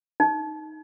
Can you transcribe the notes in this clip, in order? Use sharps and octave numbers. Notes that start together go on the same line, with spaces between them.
D#4